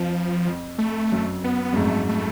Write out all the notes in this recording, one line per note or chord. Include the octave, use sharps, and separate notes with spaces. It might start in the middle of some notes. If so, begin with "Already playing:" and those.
Already playing: F2 F3
F2
A3
F#2
B3
B3
F#2
F2 G#2 A3
A3